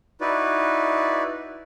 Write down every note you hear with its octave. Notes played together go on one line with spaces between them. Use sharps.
D#4 E4 F#4 B4 D5